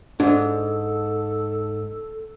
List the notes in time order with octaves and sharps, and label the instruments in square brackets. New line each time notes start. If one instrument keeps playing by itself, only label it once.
[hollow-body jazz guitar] G#2 [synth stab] D4 [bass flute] A4